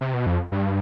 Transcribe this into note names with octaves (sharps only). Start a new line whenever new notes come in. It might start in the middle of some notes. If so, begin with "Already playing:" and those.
C3
B2
F2
G2